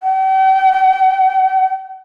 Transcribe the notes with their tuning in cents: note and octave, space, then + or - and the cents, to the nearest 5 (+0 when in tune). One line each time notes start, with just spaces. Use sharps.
G5 -40